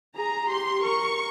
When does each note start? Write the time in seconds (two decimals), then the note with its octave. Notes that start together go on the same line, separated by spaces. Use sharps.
0.15 G#4 A#5
0.49 G4 C6
0.82 A#4 C#6